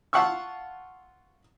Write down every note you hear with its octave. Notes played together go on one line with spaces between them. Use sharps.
F4 F5 F#5 A5 C#6 E6